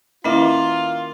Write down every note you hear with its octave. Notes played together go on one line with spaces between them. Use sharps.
D#3 A#3 C#4 E4 F4 B4 E5